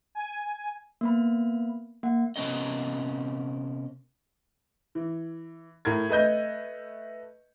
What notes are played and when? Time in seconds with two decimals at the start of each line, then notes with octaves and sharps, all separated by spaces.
0.15 G#5
1.01 A#3 B3 B5
2.03 A#3 F#5
2.36 C3 B3 C#4 A#4 D#5
4.95 E3
5.85 A2 A#4 G#6
6.09 A3 B4 D#5 G6